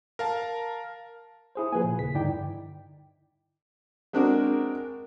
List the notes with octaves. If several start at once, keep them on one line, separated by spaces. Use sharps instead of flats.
A#4 F5 A5
E4 G#4 C5
F3 A#3 G#4 B4 G#5
A#2
D#2 C#3 B6
G2 D3 D#4 E4 D5 G5
G#3 C4 D4 F#4 A#4